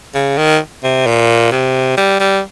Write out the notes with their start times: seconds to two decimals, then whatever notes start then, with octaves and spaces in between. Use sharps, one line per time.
0.15 C#3
0.37 D#3
0.84 C3
1.06 A#2
1.52 C3
1.97 G3
2.20 G3